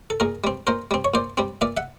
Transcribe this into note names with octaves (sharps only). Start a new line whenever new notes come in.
A4
A#2 G#4 A#4
G3 C4
A#2 A#4 C5
G3 C4
C#5
A#2 C5 D5
G3 C4
A#2 D5 E5
E5 F#5